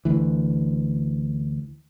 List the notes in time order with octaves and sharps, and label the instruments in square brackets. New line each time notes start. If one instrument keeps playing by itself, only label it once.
[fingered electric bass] D2 E3